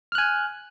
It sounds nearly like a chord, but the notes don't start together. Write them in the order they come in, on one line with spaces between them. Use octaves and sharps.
F6 F#6 G#5